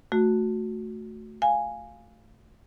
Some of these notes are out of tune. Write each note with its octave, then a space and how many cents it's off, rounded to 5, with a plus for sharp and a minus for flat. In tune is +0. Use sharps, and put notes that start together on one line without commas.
A3 +0 F#4 -15
F5 +0 G#5 +0